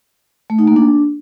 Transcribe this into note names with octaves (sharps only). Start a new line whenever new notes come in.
A3
D#4
A#3
D4